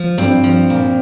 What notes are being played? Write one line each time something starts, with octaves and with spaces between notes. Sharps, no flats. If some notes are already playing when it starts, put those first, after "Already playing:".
Already playing: F3
G2 C4
F3
A#2